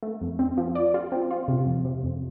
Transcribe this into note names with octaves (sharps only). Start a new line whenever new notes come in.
A3
F2
C4
F3
D5
F4
C4
F4
C3
F2
C3
F2